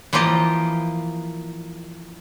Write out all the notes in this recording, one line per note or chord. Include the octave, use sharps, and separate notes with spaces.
E3 F3 A#3 F4 G4 D#5